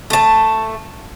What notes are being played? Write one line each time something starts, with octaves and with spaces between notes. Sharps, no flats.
A3 A5